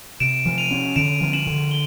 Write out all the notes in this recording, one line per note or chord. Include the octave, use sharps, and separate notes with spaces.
C3 D7 E7
F3
D#7 F7
C#4
D3 D7 E7
F3
E7 F#7
D3
G7